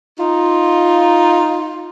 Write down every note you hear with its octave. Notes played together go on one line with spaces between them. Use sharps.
D#4 F4